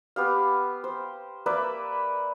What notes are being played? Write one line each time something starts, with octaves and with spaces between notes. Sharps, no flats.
B3 G4 F5
C5
A#3 B4 D5 E5